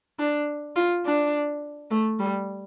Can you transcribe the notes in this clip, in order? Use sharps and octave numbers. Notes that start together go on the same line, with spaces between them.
D4
F4
D4
A3
G3